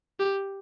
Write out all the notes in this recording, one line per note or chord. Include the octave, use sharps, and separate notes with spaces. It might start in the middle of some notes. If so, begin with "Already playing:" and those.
G4